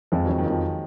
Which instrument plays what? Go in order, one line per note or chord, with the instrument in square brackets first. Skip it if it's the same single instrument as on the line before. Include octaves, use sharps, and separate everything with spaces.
[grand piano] F2 [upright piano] F3 G#3
[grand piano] F2 [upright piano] D#3 F#3
[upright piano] D#3
[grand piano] F2 [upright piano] F3